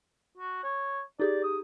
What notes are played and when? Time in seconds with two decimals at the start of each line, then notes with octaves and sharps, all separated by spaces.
0.37 F#4
0.64 C#5
1.20 D#4 G4 G#4 D5
1.44 D#6